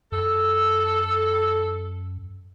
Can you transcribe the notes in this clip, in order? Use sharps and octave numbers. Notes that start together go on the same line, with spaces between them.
F#2 A4